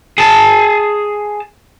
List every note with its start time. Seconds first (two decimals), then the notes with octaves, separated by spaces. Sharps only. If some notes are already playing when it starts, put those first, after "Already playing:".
0.18 G#4 A5